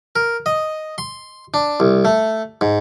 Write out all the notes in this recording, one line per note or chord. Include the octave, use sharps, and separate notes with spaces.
A#4
D#5
C6
D4
C2
A3
G#2